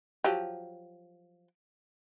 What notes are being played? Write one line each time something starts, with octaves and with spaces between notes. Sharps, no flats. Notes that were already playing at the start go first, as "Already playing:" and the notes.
F3 F#3 G4